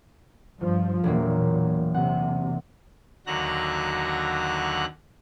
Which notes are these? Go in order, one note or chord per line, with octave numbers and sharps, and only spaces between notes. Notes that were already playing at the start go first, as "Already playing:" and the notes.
G2 F3
E1 A#2 F#3 A#3
C3 F#5
D#2 D3 F#3 F#4 A#5 F#6